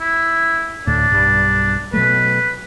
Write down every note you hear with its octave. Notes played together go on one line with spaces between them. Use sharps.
E4
D2 A2 D4
B1 G2 G3
B2 F#3 A3 B4